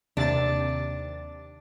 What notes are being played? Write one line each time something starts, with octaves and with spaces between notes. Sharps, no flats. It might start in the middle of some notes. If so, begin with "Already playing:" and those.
D#2 C3 D4 A6